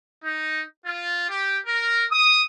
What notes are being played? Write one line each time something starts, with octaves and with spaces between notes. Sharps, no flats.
D#4
F4
G4
A#4
D#6